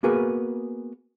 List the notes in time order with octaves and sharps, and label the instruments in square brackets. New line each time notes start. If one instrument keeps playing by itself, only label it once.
[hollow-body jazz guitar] A#3 B3 F#4 G#4 A#4 B4